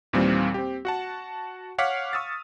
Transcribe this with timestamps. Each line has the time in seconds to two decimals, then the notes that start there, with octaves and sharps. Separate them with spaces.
0.13 D#2 A#2 E3 G3 A#3 C4
0.54 C4 G4
0.85 F#4 F#5 A5
1.78 C#5 F5 F#5 D6 F6 B6
2.13 C#6 D#6 E6 A6